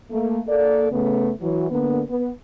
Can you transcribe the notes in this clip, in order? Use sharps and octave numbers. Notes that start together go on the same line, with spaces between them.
A3 A#3
A#3 A4 D5
C#3 A3 B3
E3 F#3
D3 A#3 B3
B3